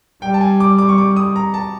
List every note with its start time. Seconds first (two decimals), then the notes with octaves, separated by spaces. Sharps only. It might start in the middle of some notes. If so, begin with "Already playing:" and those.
0.22 G3 G5
0.34 A5
0.41 G#5
0.60 D6
0.78 D6
0.89 C#6
0.98 D6
1.16 D#6
1.36 A#5
1.54 A5